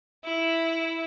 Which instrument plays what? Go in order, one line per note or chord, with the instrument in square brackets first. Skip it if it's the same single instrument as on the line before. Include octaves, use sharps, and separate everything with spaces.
[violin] E4